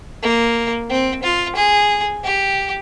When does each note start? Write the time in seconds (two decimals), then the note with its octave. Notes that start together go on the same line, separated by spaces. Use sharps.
0.22 A#3
0.90 C4
1.23 F4
1.56 G#4
2.23 G4